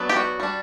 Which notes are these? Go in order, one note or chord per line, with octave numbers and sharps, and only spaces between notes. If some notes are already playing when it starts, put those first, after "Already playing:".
Already playing: F#3 B3 D4
G4
F#4
G3 D4